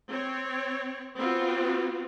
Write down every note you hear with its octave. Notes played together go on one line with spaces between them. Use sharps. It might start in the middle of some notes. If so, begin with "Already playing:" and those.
C4 C#5
B3 C4 F4 F#4